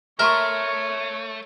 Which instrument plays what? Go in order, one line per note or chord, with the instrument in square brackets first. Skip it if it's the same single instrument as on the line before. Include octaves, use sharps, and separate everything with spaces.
[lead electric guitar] A3 [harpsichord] A#4 [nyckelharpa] C#5 [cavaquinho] E5 C6 C#6